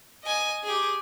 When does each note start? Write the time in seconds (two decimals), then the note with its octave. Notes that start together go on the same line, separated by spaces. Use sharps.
0.24 D#5 G#5
0.64 G4 G#4